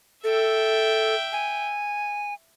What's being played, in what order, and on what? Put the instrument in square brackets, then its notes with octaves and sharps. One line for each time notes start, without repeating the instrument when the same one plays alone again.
[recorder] A4 [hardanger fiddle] E5 G5
[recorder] G#5